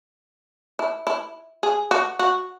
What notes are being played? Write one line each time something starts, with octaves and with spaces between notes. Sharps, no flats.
E4
E4
G#4
F#4
F#4